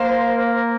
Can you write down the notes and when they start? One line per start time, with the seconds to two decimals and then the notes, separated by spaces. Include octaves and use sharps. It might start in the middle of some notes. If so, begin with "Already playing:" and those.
Already playing: A#3 C5